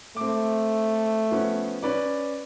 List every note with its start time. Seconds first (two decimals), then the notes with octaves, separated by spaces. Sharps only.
0.17 A3 C4 D6
1.31 F3 B3 C#4
1.82 C#4 B4 D5